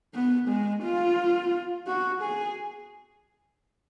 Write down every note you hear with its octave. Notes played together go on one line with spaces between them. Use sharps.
B3
G#3
F4
F#4
G#4